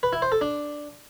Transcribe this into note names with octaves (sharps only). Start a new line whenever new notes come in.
B4
E4
C5
A4
D4